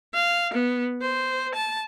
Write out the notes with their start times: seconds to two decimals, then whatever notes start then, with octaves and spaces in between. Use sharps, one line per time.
0.14 F5
0.53 B3
1.01 C5
1.54 A5